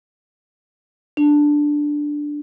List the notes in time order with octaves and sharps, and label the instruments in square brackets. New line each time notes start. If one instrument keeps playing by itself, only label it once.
[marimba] D4